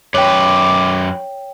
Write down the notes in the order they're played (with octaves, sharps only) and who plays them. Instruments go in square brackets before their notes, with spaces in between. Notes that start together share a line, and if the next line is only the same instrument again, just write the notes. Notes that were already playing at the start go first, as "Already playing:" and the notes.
[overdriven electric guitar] F#2 B4 [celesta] C#5 G5 [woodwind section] D6